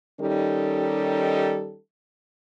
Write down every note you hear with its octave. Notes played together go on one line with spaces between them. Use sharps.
D#3 G3 C#4 D#4 G4 A4